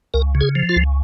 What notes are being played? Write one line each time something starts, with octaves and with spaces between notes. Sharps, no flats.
C#2 A#4
C#3
G#4
F3
F4
C#2